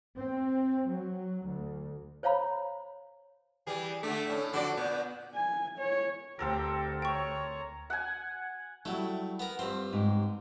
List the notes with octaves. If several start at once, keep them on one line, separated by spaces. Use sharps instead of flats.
C4
F#3
D2
C5 C#5 F5 A#5 B5
E3 G3 G#4
D3 A3 D4
A2 C#4
F2 D3 F#4 D5
A#2 B3
G#5
C#5
D2 C4 G4 A4 A#4
C#5 G5 A#5 C#6
F#5 G#5
F#3 G3 A3 E4
B3 A#4
G2 C4 F4
G#2 G4